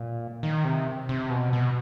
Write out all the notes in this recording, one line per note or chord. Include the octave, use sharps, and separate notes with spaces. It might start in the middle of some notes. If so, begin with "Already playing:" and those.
Already playing: A#2
D#3
C3
C3
B2
B2